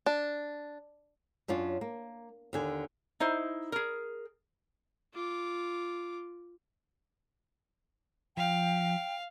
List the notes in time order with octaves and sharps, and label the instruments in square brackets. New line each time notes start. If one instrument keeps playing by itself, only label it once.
[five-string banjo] D4
[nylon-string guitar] F#2 C#4 D4 F4
A#3
D#2 D3 G#5
[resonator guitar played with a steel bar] D#4 E4 C5
G#4 A#4
[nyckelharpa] F4 D6
[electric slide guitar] F3 [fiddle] F5 [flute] G5